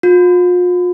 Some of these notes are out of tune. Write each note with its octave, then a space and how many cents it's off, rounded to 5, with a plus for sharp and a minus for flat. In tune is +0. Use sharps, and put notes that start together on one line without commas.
F4 +40